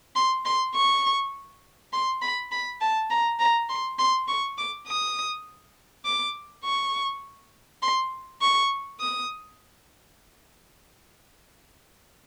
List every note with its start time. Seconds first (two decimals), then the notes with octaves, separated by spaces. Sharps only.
0.16 C6
0.45 C6
0.75 C#6
1.93 C6
2.22 B5
2.52 B5
2.81 A5
3.11 A#5
3.40 A#5
3.69 C6
3.99 C6
4.28 C#6
4.58 D6
4.87 D#6
6.05 D6
6.64 C#6
7.82 C6
8.41 C#6
9.00 D#6